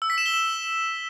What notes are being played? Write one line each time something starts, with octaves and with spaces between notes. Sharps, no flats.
E6
B6
E7
G7
E7